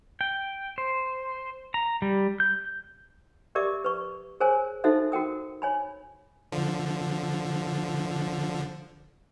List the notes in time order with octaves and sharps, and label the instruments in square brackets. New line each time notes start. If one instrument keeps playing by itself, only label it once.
[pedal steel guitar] G5
C5
A#5
G3
G6
[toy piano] G4 A#4 D5 E5 D6
B4 C#6
G#4 A#4 C5 C#5 G#5
D#4 F#4 A4 C5 E5
F#4 A#4 G5 D#6
C#5 G#5 B5
[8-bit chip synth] D3 F3